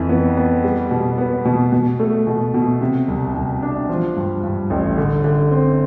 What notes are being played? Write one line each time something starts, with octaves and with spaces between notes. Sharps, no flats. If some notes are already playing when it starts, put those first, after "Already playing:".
Already playing: F2 E3
B3
B3
G3
B2
B3
B2
B2
A3
B2
B2
C3
C2
C2
D4
F3
G2
G2
A1
D3
D3
C4